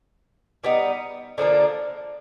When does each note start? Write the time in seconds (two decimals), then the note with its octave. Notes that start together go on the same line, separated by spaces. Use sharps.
0.64 G3 B3 D#4
1.38 D3 F3 A#3 D4